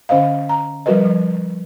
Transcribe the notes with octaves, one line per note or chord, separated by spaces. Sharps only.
D3 C#4 C5 D#5 F5
A#5
F3 G3 F#4 A#4 B4 D#5
F3